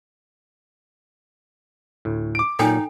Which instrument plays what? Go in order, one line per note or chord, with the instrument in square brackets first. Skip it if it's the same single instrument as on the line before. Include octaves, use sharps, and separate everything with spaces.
[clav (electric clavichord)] D2 A2
[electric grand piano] D6 D7
[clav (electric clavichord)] A#2 F#3 [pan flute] D#4 [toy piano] A4 G5 G#5